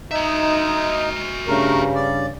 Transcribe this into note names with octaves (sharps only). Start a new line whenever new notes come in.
D#4 F#4 E5
G2 C#3 A3 A#4
D5